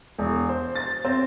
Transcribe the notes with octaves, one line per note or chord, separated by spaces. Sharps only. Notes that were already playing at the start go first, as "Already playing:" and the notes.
E1
C5
A6
C4